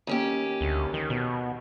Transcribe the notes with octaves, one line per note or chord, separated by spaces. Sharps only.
D#2 C#4 G4
D2
D#3
B2